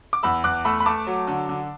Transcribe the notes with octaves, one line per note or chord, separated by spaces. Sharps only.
D6
E2 B5 E6
E2 D6 F#6
A3 B5 E6
B5
A3 A5 D6
F#3
D3
D3